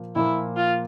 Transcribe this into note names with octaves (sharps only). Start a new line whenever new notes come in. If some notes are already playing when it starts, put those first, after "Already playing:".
Already playing: A#2 F3 A#3
A#2 F3 A#3 E4
F4